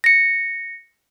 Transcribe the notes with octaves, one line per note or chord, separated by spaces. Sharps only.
A#6 C#7